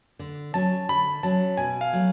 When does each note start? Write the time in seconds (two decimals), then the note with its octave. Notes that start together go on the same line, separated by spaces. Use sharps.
0.19 D3
0.54 F#3 C#4 A5
0.89 D3 B5
1.23 F#3 C#4 A5
1.58 B2 G#5
1.81 F5
1.93 F#3 A3